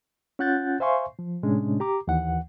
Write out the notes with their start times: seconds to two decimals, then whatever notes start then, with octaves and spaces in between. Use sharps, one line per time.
0.39 C#4 F4 F#5 F#6 G6 A6
0.80 C5 E5 F5 G#5 C6 C#6
1.19 F3
1.43 A2 C3 G#3 C#4 D4
1.80 G4 A#5 D6
2.08 D#2 E3 F#5